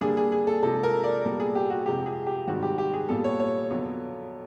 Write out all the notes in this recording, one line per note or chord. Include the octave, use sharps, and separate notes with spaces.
D3 G3 A#3 D4 G#4
G#4
G#4
A4
C3 F3 G#3 A4
A#4
D5
A#2 G3 B3 A4
G#4
G4
F#4
F2 C3 F3 G#3 G4
G#4
G4
G#2 D#3 G3 C4 F#4
G4
G4
G#4
A#2 G3 B3 A4
C#5
C#5
F2 D3 F#3 B3